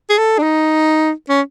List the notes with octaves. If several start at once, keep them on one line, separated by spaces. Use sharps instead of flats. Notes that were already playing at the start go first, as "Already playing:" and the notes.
G#4
A4
D4
D#4
C#4